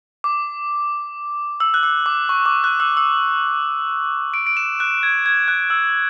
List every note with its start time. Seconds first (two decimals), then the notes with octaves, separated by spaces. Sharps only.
0.24 D6
1.60 E6
1.74 F#6
1.83 E6
2.06 D6
2.29 C#6
2.46 D6
2.64 F#6
2.80 E6
2.97 E6
4.34 D7
4.47 D7
4.57 E7
4.80 F#6
5.03 G#6
5.26 G#6
5.48 F#6
5.70 E6